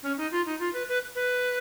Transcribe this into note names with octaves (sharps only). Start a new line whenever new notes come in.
C#4
D#4
F4
D#4
F4
B4
B4
B4